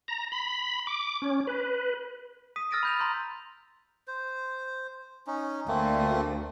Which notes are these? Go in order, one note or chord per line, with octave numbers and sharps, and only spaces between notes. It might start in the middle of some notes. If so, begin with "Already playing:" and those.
A#5
B5
D6
C#4
B4
D#6 B6 D#7
E6 F6 A6 A#6 D7 D#7
B5 G6 F7
A#5 C6 G6
C5
C#4 D#4
D2 A3 A#3 C4